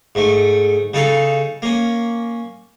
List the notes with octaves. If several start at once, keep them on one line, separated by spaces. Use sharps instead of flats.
G#2 A3
C#3 D#4 A4 F5
A#3 C#4